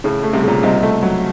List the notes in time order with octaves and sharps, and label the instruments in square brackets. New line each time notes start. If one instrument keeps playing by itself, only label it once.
[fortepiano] A2 [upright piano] C#3
[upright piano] A3
[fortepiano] C2 C3
[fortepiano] A#2 [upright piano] C#3
[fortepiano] C2 C3 [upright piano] D#4
[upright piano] A3
F#3